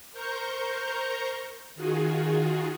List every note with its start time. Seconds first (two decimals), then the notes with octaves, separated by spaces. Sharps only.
0.12 A#4 C5 A#5 C#6 G6
1.75 D#3 F4 F#4 G#4